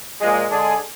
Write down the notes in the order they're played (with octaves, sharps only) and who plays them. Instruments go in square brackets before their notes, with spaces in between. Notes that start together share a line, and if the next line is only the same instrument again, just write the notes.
[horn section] A#2 F3 G#3
D3 G#3 D4 G#4